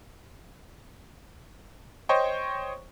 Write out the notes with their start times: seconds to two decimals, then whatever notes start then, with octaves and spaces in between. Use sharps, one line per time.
2.09 C5 C#5 D#5 G5 C#6